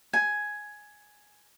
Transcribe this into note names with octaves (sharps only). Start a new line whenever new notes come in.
G#5